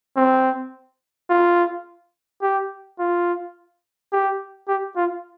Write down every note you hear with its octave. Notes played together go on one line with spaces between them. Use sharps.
C4
F4
G4
F4
G4
G4
F4